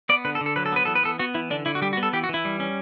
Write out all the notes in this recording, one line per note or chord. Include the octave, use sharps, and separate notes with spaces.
B3 D5
D3 B4
A4
D3
A4
F#3 B4
A4
B3 B4
E3 A4
B4
B3 A4
B3 F#4
E3 E4
D3 D4
D3 E4
F#4
G3 G4
F#4
B3
A4
E3 G4
F#4
E3 E4
G3
C#4